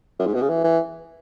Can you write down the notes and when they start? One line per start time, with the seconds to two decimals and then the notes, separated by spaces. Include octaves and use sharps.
0.19 F#2
0.27 G#2
0.34 B2
0.42 C#3
0.50 E3
0.64 E3